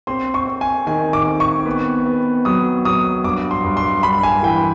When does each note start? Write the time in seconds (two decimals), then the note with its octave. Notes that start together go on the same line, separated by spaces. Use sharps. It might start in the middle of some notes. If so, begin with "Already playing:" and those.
0.07 C4 C6
0.34 C#6
0.48 C4
0.61 G#5
0.87 D#3 G#5
1.13 D6
1.26 C4
1.40 C#6
1.66 B3
2.06 B3
2.45 F#3 D#6
2.85 F#3 D#6
3.24 G2 D6
3.51 C6
3.64 G2
3.77 C6
4.03 G2 B5
4.23 G#5
4.43 E3 G5